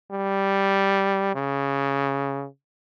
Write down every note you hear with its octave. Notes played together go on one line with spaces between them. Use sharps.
G3
C#3